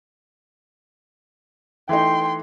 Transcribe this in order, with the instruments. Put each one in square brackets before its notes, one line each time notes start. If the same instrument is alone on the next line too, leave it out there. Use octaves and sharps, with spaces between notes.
[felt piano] E3 A3 D#4 [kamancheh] G5 C6